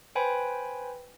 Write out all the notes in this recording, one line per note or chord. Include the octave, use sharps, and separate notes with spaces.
B4 C5 G5 G#5 B5